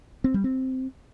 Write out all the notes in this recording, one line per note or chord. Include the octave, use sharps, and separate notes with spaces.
C4
G3
C4